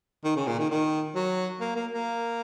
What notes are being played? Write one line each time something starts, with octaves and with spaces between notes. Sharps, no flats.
D#3
C#3
A#2
D#3
D#3
F#3
A#3
A#3
A#3